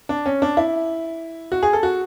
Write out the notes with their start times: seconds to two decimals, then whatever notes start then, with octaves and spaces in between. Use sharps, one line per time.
0.09 D4
0.26 C#4
0.42 D4
0.57 E4
1.52 F#4
1.63 G#4
1.73 A4
1.83 F#4